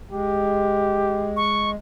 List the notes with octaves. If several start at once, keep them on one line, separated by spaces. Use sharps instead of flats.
G#3 G4
C#6